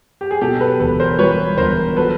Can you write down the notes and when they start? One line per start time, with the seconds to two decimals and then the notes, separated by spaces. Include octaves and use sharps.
0.21 G4
0.31 G#4
0.41 B2 G4 A4
0.61 A4 B4
0.80 E1 A4 B4
1.00 A#4 C5
1.19 G3 B4 C#5
1.57 E1 A#4 C5
1.96 F#3 A4 B4